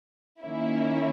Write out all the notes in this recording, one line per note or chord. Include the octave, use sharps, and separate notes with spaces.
D#3 A#3 C#4 E4